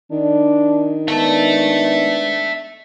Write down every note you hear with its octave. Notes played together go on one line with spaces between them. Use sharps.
D#3 D4
G#3 B3 D4 E5 A5